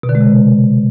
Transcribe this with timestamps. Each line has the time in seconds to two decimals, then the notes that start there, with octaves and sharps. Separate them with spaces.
0.03 B2
0.09 D3
0.15 G#3
0.21 C3